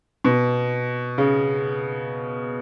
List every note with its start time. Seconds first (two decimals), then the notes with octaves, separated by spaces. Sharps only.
0.24 B2
1.18 C#3